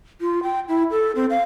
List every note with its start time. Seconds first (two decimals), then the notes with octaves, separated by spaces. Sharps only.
0.21 F4
0.43 G5
0.69 E4
0.91 A4
1.15 C4
1.30 F5